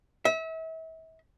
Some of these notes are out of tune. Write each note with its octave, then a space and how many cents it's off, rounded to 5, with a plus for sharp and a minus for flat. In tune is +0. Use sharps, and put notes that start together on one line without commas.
E5 -35